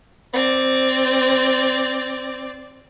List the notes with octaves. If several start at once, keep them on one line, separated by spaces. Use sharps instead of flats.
C4 D5